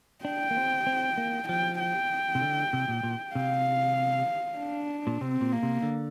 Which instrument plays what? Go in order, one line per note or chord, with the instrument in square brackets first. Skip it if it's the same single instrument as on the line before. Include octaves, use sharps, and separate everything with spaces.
[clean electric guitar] D4 [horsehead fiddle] G5
[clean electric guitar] A#3
C4
C4
A#3
[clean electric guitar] F3 [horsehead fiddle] G5
[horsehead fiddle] G5
[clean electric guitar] C3
D3
C3
A#2
A#2
[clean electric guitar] C3 [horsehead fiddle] F5
[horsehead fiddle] D4
[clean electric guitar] A#2
[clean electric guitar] C3 [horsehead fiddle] C4
[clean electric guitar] A#2
[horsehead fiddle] A#3
[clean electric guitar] C3
D3